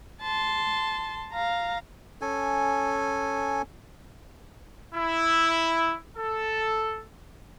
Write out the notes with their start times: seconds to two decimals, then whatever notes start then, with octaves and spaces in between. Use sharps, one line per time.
0.22 A5 C6
1.32 F5 A#5
2.21 C#4 A4 G#5
4.94 E4
6.16 A4